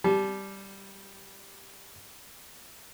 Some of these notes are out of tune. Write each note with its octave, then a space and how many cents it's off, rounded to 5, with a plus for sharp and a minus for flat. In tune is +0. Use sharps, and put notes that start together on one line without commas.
G3 +0 A5 -30